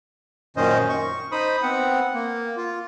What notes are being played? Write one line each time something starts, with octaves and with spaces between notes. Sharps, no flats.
F#2 A#2 D#3 C#4 C5 D#5
C#6
D#4 C5 B5 D#6
B3 C4 F#5
A#3
F4